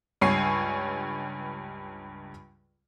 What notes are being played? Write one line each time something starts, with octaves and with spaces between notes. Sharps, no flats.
C#2 G2 C#5 G#5 C7